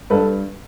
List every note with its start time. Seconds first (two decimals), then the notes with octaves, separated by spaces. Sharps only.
0.10 G2 A4 B4